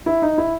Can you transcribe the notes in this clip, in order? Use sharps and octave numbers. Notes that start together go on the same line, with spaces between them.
E4
D#4
E4